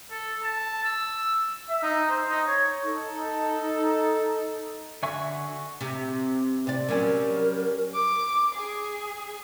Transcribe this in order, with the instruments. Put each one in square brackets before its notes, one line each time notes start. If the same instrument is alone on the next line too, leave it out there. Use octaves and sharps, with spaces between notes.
[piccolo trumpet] A4
A5
E6
[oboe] E5
D#4
C5
D#4
C#5
[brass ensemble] D#4 A4
[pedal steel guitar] D3 F#4 E5 G#5 C#6
[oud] C3
C3 D5
[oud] F#3 G3 C#4 [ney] A#4
[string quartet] D6
G#4